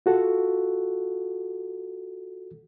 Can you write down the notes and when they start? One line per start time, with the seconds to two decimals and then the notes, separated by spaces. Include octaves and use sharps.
0.06 F4 F#4 A4